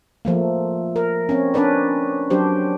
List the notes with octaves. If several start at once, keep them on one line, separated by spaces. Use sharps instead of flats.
F3 A3 A#3
A#4
C4 C#4
C#4 D4 A#4 B4 D5
F#3 D4 G4 C5